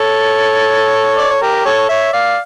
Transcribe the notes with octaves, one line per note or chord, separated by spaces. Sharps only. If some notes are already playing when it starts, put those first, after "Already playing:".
Already playing: A4 C#5
D5
C#5
G4 A#4
A4 C#5
C#5 E5
D5 F5